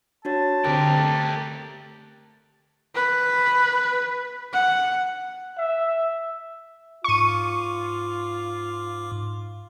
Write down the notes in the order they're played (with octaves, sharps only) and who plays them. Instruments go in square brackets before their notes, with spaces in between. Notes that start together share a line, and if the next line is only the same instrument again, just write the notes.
[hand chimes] D4 F#4 C#5 [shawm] A5
[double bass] D3 C4 [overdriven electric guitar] G4 A#4 [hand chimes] F#6
[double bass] A3
[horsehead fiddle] B4
F#5
[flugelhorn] E5
[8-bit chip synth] G#2 D6 [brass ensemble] F4 [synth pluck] C#6 D#7